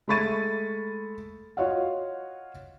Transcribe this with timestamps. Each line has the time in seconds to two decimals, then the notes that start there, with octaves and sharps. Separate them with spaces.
0.08 G#3 A3 B5 C#6 A6 D#7
1.57 F4 F#4 C#5 D#5 F5 F#5